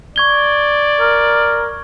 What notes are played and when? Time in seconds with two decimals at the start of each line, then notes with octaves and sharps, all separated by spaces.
0.16 D5 C#6 G#6 G7
1.00 A#4